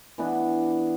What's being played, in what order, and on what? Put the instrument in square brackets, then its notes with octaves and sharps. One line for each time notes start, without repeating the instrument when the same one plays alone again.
[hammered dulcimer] E3 B3 D4